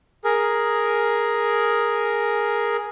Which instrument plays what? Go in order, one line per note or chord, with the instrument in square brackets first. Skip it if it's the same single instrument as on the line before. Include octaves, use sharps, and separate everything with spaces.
[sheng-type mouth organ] G#4 A#4